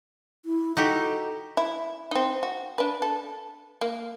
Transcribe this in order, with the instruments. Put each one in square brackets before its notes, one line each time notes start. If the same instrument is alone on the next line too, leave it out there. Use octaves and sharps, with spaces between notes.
[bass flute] E4
[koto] D#4 F#4 G4 [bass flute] A4
[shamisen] E4
C4 D#4
F#4
D4 B4
A4
A#3